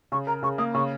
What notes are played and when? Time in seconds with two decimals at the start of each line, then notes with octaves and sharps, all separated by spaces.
0.12 C#3 C#6
0.27 A#4 A#5
0.43 C#3 C#6
0.58 A#3 D#6
0.74 C#3 C#6